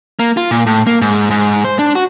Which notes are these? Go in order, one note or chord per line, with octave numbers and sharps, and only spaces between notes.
A#3
F4
A#2
A2
A#3
G#2
G#2
C5
D4
F#4